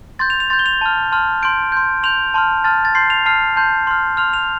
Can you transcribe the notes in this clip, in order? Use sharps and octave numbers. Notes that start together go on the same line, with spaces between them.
C6 G6 A6
F7
F7
C6 G6 A6
G7
F7
A5 F6
A5 C6 F6
C6 G6 D7
C6 G6
C6 G6 F7
A5 C6 F6
A5 C6 F6 A6
A6
C6 G6 C7
F7
A5 F6 C7
A5 C6 G6
C6 F6
C6 F6 F7
F7